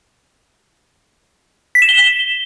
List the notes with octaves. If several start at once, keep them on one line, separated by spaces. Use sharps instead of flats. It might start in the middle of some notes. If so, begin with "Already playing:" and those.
B6
E7
G7